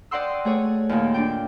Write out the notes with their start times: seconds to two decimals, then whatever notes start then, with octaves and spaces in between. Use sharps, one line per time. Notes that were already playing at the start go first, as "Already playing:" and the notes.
0.11 D5 D#5 F#5 G5 C6 E6
0.45 A3 G#4 C#5
0.89 D#2 A#2
1.14 D4 G5